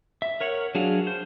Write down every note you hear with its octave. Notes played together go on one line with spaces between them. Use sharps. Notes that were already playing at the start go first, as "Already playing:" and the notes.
E5
A#4 C#5 F#5
F#3 D4 G#4 F5 F#5
C5